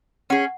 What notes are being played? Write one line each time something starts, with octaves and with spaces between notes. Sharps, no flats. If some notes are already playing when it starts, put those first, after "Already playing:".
C#4 G#4 F#5